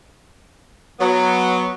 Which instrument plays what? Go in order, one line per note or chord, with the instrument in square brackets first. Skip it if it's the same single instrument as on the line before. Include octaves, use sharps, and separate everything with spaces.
[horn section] F#3 B3